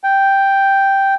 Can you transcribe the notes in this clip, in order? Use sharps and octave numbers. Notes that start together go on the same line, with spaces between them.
G5